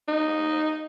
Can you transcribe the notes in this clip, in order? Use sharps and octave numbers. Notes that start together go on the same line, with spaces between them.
D#4